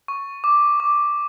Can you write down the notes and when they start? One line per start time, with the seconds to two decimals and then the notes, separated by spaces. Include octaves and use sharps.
0.08 C#6
0.44 D6
0.80 D6